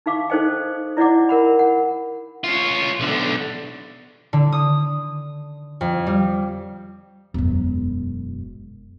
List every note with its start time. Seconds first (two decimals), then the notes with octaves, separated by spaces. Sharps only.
0.06 D#4 G4 F5 D6
0.30 D#4 A4 C5 D#5 G5
0.97 E4 D5 D#5 F#5 D6
1.29 A#4 F#5 B5
1.59 F#5
2.44 C#4 F4
3.00 B1 D3
4.33 D3
4.52 D#6
5.81 F2
6.07 G3
7.34 E1 F#2